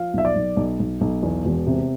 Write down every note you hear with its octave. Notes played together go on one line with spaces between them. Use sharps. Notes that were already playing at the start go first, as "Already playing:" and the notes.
Already playing: F3 F5
B1 E5
D5
B1
B1
B1
B1
E2
E1
C3